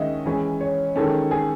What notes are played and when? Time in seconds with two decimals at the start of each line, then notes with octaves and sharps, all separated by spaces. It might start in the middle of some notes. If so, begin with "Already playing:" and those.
Already playing: D#3 G#3 C#4 D#5 E5 F#5
0.26 E3 G#3 C#4
0.61 C#5
0.96 D#3 G#3 C#4 A4
1.31 G#4